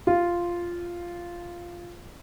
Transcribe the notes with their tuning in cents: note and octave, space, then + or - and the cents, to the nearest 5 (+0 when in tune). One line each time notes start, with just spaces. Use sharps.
F4 -5